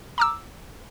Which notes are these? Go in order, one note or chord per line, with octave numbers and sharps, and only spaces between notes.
A#5 D6 E6